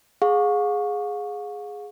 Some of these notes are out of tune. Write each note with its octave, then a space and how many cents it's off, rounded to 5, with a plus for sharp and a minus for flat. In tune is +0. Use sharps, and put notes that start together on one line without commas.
G#4 +0 F5 +45 C#6 +0